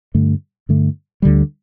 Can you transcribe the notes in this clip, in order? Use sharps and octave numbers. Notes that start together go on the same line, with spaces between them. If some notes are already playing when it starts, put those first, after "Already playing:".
G2 D3 A3
G2 D3 A3
D2 D3 G3